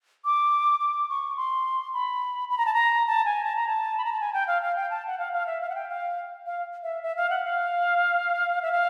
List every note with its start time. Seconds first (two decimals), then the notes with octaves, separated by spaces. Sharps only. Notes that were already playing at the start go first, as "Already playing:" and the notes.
0.25 D6
0.81 D6
1.10 C#6
1.37 C6
1.94 B5
2.50 B5
2.58 A#5
2.66 A5
2.74 A#5
3.07 A5
3.25 G#5
3.44 A5
3.56 A#5
3.68 A5
3.98 B5
4.05 A#5
4.13 A5
4.20 G#5
4.34 G5
4.47 F5
4.62 F5
4.76 G5
4.90 A5
5.07 F#5
5.19 F5
5.33 F5
5.47 E5
5.61 F5
5.69 F#5
5.75 G5
5.89 F5
6.46 F5
6.83 E5
7.03 E5
7.16 F5
7.30 F#5
7.44 F5
8.63 E5
8.72 F5